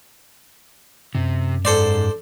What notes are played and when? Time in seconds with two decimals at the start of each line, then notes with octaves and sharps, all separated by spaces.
1.15 F#2 C3
1.65 G#2 A4 C5 D5